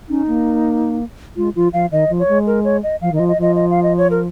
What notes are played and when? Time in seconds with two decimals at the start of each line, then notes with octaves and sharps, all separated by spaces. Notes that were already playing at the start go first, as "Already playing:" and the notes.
0.09 C#4 D#4
0.27 A#3
1.37 G#3 F4
1.55 F3 F4
1.73 F3 F5
1.91 D#3 D#5
2.10 F3
2.20 C#5
2.28 G#3
2.47 A#4
2.64 C#5
2.83 D#5
3.01 F3 F5
3.12 D#3
3.16 D#5
3.19 F3
3.28 D#5
3.38 F3 D#5
3.56 D#5
3.70 F5
3.83 D#5
3.98 C#5
4.11 A#4